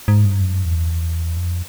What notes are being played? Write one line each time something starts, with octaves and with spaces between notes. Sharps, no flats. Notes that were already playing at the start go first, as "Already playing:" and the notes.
G#2
G2
F#2
E2
F2